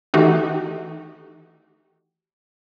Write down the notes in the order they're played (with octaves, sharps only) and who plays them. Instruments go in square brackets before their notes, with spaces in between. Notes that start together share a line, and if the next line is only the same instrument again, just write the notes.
[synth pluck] D#3 E3 A3 D#4 F#4 G4